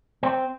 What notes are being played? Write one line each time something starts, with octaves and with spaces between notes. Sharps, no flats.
C4